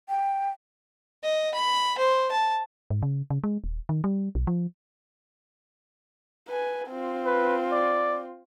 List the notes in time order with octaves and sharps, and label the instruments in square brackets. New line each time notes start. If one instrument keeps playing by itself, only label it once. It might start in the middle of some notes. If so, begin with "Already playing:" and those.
[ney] G5
[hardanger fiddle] D#5
B5
C5
A5
[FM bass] G#2
C#3
C#3
G#3
D#1
D#3
G3
B1
F3
[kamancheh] B4 G#5
C4 F4
[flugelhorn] B4
D5